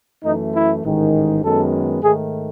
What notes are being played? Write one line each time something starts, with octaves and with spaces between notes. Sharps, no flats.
F#2 E3 A3 D#4
E4
A1 G#2 D#3 G#3
F#2 D#3 G#3 B3 A4
G#2 D#3 A3 G#4